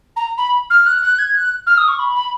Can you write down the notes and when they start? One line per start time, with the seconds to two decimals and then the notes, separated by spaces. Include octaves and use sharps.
0.16 A#5
0.37 B5
0.70 F6
0.86 F#6
1.02 F#6
1.18 G#6
1.34 F#6
1.66 F6
1.77 D#6
1.88 C#6
1.99 B5
2.15 B5